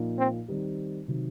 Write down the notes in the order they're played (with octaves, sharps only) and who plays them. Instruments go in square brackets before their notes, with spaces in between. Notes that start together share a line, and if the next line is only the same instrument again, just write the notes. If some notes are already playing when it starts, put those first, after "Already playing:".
Already playing: [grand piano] A#2 F3 A#3 D#4
[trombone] C4
[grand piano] D#3 G3 C4 D#4 G4
C3 D#3 F#3